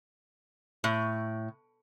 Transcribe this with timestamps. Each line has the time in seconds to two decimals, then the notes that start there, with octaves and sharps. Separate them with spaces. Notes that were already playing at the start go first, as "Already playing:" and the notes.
0.84 A2